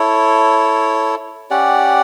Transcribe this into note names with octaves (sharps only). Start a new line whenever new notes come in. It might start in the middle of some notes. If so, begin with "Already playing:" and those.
Already playing: E4 A4 C#5
C#4 G4 D5 F#5